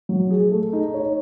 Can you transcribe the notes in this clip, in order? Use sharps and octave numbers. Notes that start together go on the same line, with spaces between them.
F#3
G#4
A3
D#4
C#5